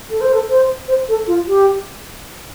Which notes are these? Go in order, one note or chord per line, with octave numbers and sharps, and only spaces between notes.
A4
C5
A4
C5
C5
A4
F4
G4